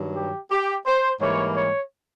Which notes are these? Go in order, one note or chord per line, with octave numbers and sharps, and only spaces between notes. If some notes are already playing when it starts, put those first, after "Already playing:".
Already playing: G2 D#3 F#3
G4
G4
C5
G#2 E3 G3 A#3 C#5
C#5